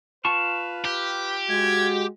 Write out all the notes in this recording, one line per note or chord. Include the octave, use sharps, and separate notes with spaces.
F4 B4 A5 C#6
G4
G#3 F#4 G#6